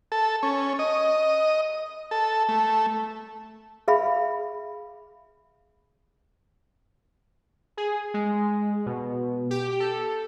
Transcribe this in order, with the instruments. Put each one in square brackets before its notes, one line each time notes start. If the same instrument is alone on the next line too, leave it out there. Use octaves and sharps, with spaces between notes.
[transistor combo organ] A4
C#4
D#5
A4
A3
[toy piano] G#4 E5 F5 B5
[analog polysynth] G#4
G#3
B2
G4
A4